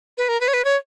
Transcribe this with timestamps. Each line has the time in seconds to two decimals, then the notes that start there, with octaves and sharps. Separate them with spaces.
0.18 B4
0.28 A#4
0.41 B4
0.48 C#5
0.53 B4
0.65 C#5